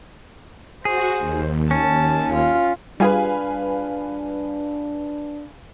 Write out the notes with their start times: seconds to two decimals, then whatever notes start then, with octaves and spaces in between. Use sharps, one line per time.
0.85 F#4 G#4 C5
1.18 D#2
1.71 C#4 A5
2.33 F4
3.00 G3 D4 F4 G#4 B4 F5 G#5